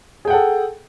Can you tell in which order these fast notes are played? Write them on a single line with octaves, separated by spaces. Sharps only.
G#4 G5 F#5 A4